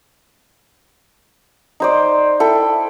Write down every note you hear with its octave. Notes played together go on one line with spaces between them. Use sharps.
D#4 C5 D5
E4 A4 G5